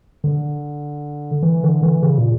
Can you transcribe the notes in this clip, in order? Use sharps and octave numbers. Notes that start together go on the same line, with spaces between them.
D3
E3
D3
E3
C#3
A#2